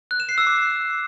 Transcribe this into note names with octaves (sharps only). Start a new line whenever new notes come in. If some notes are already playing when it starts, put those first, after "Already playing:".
F#6
E7
C7
E6
D6